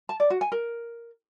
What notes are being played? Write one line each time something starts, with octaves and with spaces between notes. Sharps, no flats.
A5
D5
F#4
G#5
A#4